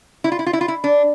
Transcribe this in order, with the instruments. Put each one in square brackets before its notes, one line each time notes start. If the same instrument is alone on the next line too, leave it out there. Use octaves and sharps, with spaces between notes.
[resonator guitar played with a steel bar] E4
F4
E4
F4
E4
F4
E4
D4